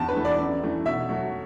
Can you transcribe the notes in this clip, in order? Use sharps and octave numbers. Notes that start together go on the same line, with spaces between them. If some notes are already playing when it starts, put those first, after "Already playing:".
Already playing: E2 A5
B4
E3 A3
D5
F#2
E3 A3
B2 E5
F#3 A3